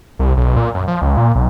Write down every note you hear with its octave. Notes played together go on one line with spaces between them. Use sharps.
C2
B1
A#2
F#2
F3
C#2
A#2
B1